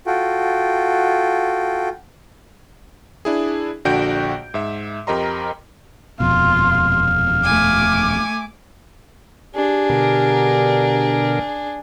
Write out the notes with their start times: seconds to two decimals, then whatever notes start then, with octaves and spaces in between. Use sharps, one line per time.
0.07 F4 F#4 A4 G5
3.25 D4 E4 G#4
3.85 A#1 D3 F#4 G5 G6 D7
4.54 G#2 E5
5.07 F2 G4 A#4 D#5 A#5 C6
6.20 D#1 F2 B2 F4 F5
7.44 A3 G#5 D6
9.55 D4 G4 G#4
9.89 B2 D3 A#4